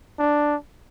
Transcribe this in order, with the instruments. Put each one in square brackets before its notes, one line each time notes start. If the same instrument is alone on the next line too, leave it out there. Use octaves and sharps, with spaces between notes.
[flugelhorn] D4